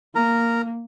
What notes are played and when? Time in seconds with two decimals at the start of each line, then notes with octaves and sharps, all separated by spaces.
0.15 A#3 A#4 A#5